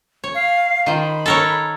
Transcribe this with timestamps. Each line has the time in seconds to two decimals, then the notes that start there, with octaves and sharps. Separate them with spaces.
0.24 C#5
0.35 F5
0.86 D#3 F4 C5
1.00 B5
1.26 A4 A#4 C#5